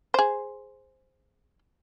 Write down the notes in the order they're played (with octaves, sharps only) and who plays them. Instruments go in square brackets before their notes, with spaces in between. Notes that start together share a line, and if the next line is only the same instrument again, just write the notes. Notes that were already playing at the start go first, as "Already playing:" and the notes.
[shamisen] G#4 C5